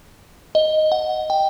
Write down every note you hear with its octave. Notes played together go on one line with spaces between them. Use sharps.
D#5
F#5
G5